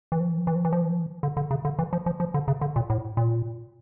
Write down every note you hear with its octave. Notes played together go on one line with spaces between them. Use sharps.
E3
F3
E3
F3
E3
F3
E3
F3
E3
F3
E3
D3
D3
C#3
D3
E3
F3
F3
F3
D3
C#3
D3
A#2
A2
A#2